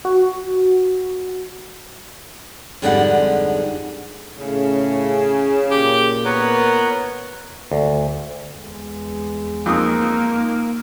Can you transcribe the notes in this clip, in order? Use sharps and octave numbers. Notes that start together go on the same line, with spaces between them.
F#4
F2 G#2 D3 G3 G#3 F#5
A2 C#3
A#2 G4
B3 A#4 C#5
D2
E2 G#3
F2 A#3 D#4 D#6